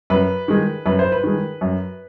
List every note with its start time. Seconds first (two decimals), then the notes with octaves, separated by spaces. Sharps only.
0.10 F#2 B4
0.48 D#3 G#3
0.86 F#2 B4
0.99 C5
1.12 B4
1.23 D#3 G#3
1.61 F#2